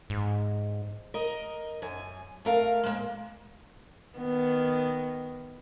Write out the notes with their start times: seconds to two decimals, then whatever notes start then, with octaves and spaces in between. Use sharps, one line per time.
0.10 G#2
1.14 A#4 D#5
1.82 F#2 G#5
2.45 A3 A#4 F5
2.83 G#3 A#3
4.18 D#3 B3